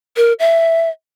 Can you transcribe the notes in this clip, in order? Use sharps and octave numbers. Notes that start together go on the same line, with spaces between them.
A#4
E5